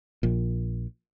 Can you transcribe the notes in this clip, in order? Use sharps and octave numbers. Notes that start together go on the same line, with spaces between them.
A#1 A#2